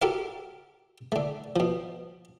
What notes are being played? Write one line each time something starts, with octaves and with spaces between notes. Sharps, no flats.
F#4 G4 A4 A#4 F5
D3 A3
B2 F3